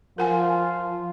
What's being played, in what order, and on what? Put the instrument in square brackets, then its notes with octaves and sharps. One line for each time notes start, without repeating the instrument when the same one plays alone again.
[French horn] F3 [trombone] F4 [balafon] A#4 F#5 G#5